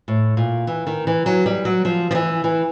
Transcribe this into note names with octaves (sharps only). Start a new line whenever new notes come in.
A2
A#2
E3
D#3
E3
F#3
G3
F#3
F3
F3
E3
E3